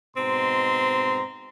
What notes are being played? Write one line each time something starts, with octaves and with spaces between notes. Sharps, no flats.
G#2 B2 C4 A#5 C6